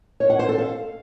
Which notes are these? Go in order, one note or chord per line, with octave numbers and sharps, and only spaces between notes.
C#5
F#5
C5
A4
F5